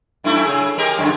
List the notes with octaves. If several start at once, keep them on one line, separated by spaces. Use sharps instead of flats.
F#2 A3 E4
C#3 G#4
G#3 G4 A#4
F#2 D3 G#3